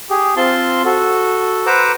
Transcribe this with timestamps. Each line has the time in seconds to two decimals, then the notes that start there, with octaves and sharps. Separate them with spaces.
0.10 G4 G#4
0.37 C4 F4 A5 C6
0.85 F#4 A4
1.66 B4 C5 F#5 A#5 D6 E6